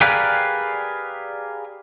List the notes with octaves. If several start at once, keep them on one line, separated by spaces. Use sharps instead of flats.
G4 G#4 A#4 B4 D5 F5